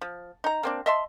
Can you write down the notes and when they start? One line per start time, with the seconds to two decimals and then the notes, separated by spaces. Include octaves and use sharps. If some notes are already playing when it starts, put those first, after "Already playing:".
0.01 F3
0.44 D#4 A#5
0.63 A#3 C4 D4
0.86 D#5 E5 A5 C6